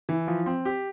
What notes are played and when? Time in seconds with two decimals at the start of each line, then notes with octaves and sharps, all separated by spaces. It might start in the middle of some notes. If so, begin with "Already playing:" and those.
0.09 E3
0.27 F3
0.46 C4
0.65 G4